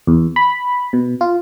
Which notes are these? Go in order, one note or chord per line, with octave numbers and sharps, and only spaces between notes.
E2
B5
B2
F4